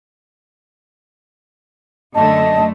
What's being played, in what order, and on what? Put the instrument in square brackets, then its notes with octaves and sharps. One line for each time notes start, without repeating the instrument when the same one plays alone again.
[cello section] F#2 D3 A3 [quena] D#5 [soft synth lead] A5